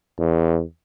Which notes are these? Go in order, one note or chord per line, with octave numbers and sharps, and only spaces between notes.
E2